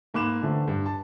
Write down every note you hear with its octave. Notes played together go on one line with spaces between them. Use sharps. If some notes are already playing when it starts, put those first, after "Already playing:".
G#2 A#3 B5 D6 F#6 E7
D3 E3 A3 C4
G2
A5